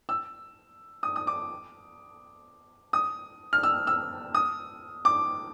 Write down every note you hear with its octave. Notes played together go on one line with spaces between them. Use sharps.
E6
D#6
D#6
D6
D#6
F6
E6
E6
D#6
D6